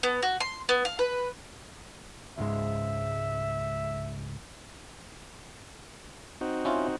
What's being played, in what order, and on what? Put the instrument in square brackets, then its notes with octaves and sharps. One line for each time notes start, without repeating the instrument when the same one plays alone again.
[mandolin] B3
F#4
C6
B3
F5
B4
[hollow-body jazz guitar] C#2 G#2 G#3 [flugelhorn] E5
[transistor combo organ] C4 D#4 F#4
[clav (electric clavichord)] C#4 E4 F4